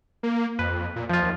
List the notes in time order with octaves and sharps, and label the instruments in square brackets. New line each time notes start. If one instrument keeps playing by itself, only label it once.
[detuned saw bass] A#3
[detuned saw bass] F2 [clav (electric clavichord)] B4
[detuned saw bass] A#2
[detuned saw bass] F2 [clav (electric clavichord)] F3 F4
[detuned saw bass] D#2